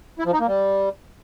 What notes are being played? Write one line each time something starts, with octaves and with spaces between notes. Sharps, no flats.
E4
F3
D#4
A#3
G3